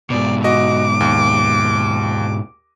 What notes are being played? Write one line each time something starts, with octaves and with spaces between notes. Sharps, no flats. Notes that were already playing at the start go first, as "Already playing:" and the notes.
G#2 B2 D5
F#4 D#5 D6
D#2